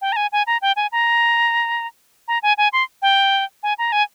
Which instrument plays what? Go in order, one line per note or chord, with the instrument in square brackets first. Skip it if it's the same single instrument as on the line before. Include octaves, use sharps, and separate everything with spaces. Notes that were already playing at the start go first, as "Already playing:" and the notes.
[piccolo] G5
A#5
G#5
G#5
A#5
G5
G#5
A#5
A#5
G#5
G#5
C6
G5
G#5
A#5
G#5